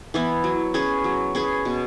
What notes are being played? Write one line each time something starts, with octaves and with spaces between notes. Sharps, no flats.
E3 B3 E4
F#3
C#4 G#4 B4
F#3
C#4 G#4 B4
B2